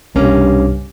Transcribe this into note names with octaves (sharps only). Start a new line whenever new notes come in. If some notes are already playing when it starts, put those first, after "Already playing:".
C2 G2 B2 A#3 C#4